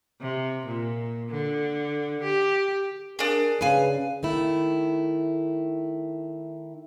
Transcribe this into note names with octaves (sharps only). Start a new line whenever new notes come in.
C3
A#2
D3
G4
D4 G#4 A#4
C#3 B4 F5 G#5
D#3 A3 E4